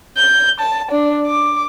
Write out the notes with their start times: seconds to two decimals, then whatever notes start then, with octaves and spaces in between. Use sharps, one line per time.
0.17 G6
0.60 A5
0.91 D4
1.27 D6